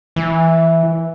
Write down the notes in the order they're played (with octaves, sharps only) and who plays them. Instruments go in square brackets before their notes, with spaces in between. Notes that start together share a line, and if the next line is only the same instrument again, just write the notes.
[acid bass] E3